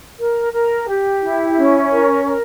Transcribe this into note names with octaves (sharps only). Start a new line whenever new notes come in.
A#4
A#4
G4
E4
C#4
A#4
A#4